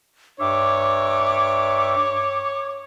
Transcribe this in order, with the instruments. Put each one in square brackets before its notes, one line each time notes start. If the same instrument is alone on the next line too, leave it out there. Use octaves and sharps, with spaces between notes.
[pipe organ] G2 E5 [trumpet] C#5 [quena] D6